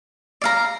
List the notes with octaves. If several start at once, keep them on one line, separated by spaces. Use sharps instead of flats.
D5 F5 A#5